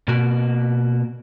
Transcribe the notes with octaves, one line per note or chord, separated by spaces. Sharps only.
B2 A#3 F#4